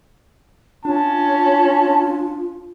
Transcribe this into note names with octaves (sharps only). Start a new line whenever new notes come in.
C#4 D4 F4 A5